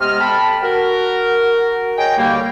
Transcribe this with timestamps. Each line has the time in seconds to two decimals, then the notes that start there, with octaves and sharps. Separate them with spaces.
0.01 C3 G#3 B3 D#5 F6
0.21 A4 G5 A5 B5
0.63 F#4 A#4
1.98 G#4 C#5 D#5 G5
2.17 D#2 D3 G3 A#3